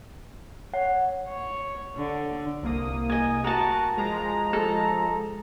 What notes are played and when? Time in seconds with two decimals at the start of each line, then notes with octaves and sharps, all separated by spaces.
0.74 C#5 F#5
1.29 C#5
1.97 D3
2.62 C2 A#3 D#6
3.10 D#5 G#5
3.44 F#4 A#4 A5
3.97 F3 G#3 A#5
4.53 A4